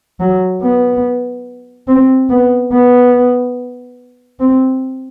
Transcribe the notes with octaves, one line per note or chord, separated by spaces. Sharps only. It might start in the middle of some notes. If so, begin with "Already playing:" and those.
F#3
B3
C4
B3
B3
C4